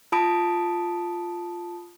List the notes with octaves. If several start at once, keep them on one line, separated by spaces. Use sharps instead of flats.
F4 A5 B5 D#6 D7